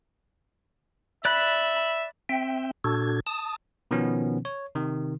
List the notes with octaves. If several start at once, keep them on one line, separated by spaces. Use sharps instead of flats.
D5 E5 B5 F#6
C4 E5 G5
A#2 D4 F#4 A4 G#6
A5 D#6
B2 D#3 F3 B3 C#4
C#5
C3 D#3